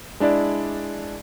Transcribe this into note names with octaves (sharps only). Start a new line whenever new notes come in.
G#3 D4 E4 D5